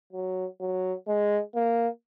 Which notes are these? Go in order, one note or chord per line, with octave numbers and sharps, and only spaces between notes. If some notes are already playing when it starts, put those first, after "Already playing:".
F#3
F#3
G#3
A#3